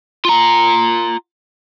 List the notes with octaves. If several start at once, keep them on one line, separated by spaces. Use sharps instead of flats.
F4 A#5